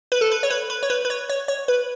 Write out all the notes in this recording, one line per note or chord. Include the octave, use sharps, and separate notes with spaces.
B4
A4
B4
C#5
B4
B4
C#5
B4
B4
C#5
C#5
C#5
B4